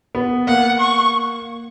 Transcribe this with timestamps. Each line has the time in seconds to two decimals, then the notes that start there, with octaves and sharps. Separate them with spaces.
0.15 B3
0.47 A#3 F#5
0.80 C#6